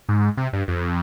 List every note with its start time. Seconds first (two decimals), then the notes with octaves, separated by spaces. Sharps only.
0.09 G#2
0.37 C3
0.53 G2
0.68 F2